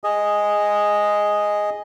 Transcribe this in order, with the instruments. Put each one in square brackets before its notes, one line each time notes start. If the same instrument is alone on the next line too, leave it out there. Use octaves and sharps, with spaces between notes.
[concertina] G#4 D#5